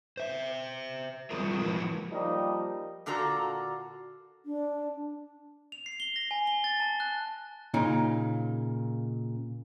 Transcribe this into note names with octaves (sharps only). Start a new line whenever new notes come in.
C5 E5
F#3 G3 C4 F4 G#4 A#4
F3 F#3 G#3 E4 A#4 B4
F3 G3 A#3 D#4
A#2 D3 F4 F#4 A4 A#5
D4
F7
C7
G7
A#6
G#5
G7
A6
A5
F#6
A#2 C#3 D#4